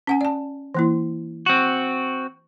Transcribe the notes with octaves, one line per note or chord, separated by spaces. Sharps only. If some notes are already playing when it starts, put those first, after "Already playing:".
C#4 F#5 G#5
D5 A5
E3 A#3 E4
C4 F#4